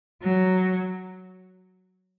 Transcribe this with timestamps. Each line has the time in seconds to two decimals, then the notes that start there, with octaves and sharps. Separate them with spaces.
0.22 F#3